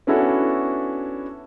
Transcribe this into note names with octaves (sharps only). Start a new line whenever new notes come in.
B3 C#4 D4 E4 F#4 A4